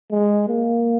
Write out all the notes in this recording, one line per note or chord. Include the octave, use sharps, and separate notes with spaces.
G#3
A#3